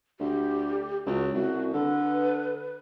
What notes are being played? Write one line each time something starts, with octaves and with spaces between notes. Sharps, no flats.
D2 G4
C#2 F#4
C2 F#4
D3 B4